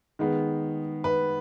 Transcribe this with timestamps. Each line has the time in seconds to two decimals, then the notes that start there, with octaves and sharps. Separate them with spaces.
0.19 D#3 G#3 B3
1.04 B4